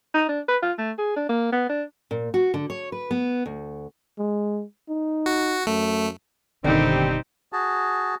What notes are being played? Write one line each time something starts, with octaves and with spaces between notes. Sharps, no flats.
D#4
D4
B4
F4
A3
G#4
D4
A#3
B3
D4
A#2
F#4
D3
C#5
B4
B3
D2
G#3
D#4
F#4
F#2 A3
F#1 B2 D3 D#3 G3 C4 D#4 G4
F#4 G#4 A5